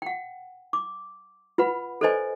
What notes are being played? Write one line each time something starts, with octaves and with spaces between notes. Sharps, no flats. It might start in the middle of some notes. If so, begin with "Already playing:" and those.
F#5 G5
D6
F4 B4 F#5 B5
A4 B4 C5 D5 D#5 G#5